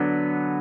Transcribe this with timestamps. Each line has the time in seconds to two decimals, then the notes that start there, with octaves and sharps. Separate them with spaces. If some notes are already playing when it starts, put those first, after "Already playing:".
Already playing: D3 F#3 B3 D4